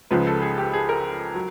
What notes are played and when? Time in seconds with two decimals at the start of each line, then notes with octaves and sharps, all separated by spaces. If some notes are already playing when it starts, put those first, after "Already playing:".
0.11 C#2 C#3 F3 G#3 B4
0.27 A4
0.42 G#4
0.58 G4
0.74 G#4
0.89 A#4
1.35 F#3